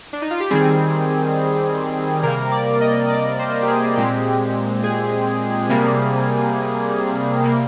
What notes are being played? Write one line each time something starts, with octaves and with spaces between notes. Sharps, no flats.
D4
D#4
F4
G4
D#3 G3 C4 G#4
C3 G3 A#3 A#4
D5
D#5
D5
C5
G4
G#4
A#2 G#3 C4 G4
G#4
C3 G3 A#3
C3 G3 A#3